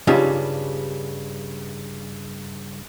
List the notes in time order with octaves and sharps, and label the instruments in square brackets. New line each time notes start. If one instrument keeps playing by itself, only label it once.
[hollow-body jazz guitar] G2 C#3 G3 [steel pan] C#4 D#4 F4